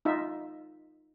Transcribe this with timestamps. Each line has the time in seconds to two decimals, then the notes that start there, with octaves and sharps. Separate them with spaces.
0.05 D#4 F4 E5